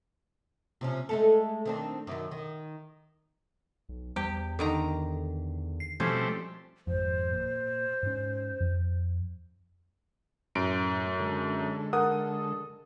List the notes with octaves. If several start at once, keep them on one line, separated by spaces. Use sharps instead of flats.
C3 F3 C#4
G#3 A3 A4
D#3 C4 D4
F#2 D#3
D#3
B1
E2 G3 G4
D3 D#3 A4 A#5
C7
B2 F3 G3 A3 C4 C#4
G#1 F2 C5
A#2
G#2 C#4
F2
F#2 A2 D7
D3 G#3 A4
A#4 F#5 D#6